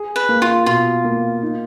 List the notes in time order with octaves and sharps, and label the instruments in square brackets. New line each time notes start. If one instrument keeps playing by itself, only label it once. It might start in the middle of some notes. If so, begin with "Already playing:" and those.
Already playing: [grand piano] G#4
[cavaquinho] B4
[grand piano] A#3
[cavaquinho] F4
[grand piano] B2 [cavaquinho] F4
[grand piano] A#3
D#4